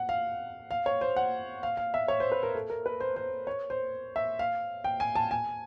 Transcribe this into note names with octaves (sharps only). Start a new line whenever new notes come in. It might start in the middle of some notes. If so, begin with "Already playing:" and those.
Already playing: F#5
F5
F5
C#5
C5
F#5
F5
F5
E5
C#5
C5
B4
A#4
A4
A#4
B4
C5
C5
C#5
C5
E5
F5
G5
G#5
A5
G#5